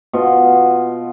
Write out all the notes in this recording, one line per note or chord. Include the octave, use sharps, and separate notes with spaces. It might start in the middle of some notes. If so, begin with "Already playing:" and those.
B2 F4